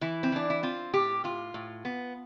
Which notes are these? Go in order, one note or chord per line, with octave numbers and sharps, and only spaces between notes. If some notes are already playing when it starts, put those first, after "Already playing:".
E3 E4
C4
E3 D4
E4
C4 F4
A2 G4
A2 F4
A2
B3